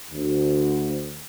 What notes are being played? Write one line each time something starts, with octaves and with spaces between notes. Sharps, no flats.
D2